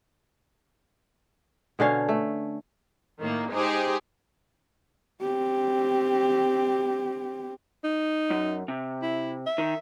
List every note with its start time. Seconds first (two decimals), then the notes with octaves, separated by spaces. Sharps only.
1.79 B2 D3 C#4 F5
2.09 A3
3.20 A2 D#3 A#3
3.52 G#3 D#4 G4 G#4 C5
5.21 C4 G4
7.84 D#4
8.30 F#2
8.68 C3
9.03 E4
9.46 E5
9.58 D#3